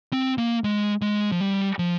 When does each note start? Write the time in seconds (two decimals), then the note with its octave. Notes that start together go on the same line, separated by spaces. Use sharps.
0.13 C4
0.38 A#3
0.64 G#3
1.02 G#3
1.32 F3
1.41 G3
1.79 F3